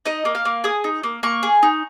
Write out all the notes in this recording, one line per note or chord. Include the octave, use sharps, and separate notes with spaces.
D#4 D#5
A#3
F5
A#3
G#4 D#6
D#4
A#3
A#3 C#6
G#4
D#4